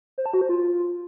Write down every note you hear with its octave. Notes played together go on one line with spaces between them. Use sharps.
C5
A5
F#4
C5
F4